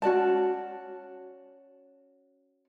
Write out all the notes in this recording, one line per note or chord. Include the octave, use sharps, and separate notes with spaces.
C#4 F#4 D5 A5